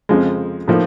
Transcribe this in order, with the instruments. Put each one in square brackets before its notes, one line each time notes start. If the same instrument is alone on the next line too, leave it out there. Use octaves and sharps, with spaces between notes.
[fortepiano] F2 C#3 F3 G#3
A2 F3 A#3 D#4